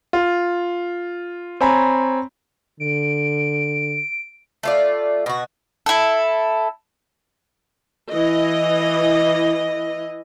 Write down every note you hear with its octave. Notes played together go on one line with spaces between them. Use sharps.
F4
C4 C#5 G#5 A#5 B5
D3 D7
A3 F4 D5
B2 F#4
E4 A4
E3 D#5